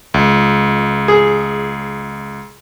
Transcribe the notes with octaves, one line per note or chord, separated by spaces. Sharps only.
C#2
G#4